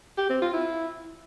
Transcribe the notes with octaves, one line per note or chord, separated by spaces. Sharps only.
G4
C4
F4
E4